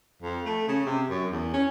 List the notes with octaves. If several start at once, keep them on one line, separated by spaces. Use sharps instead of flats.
F2
A3
C#3
C3
F#2
E2
C#4